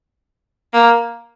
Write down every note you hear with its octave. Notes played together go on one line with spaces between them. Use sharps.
A#3